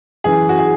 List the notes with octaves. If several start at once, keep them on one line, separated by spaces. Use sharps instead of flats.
F#2 E3 G#4
F#4
G#4